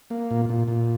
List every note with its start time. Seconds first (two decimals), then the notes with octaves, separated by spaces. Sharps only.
0.10 A#3
0.31 A#2
0.49 A#2
0.68 A#2